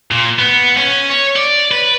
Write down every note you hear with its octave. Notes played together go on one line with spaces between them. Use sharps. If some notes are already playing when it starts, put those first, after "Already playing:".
A#2
B3
C#4
C#5
D5
B4